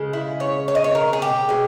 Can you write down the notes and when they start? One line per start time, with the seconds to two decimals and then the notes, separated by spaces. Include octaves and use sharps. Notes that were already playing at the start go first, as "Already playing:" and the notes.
Already playing: C#3 G#3
0.13 E4
0.40 C#5
0.68 C#5
0.75 D#5
0.84 C#5
0.95 A#4
1.13 G#4
1.22 G4
1.49 B2 G#3